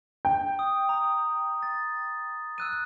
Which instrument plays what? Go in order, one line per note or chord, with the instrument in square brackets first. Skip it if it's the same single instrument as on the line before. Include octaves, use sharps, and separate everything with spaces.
[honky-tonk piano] G5
[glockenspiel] D#6
A#5 D#6
A6
E6 F#6 D#7